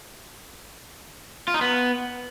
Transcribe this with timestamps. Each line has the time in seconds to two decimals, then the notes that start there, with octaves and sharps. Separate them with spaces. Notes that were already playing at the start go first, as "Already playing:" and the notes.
1.48 F4
1.54 D#4
1.61 B3